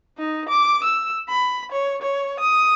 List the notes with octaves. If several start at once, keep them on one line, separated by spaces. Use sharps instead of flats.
D#4
D6
E6
B5
C#5
C#5
D#6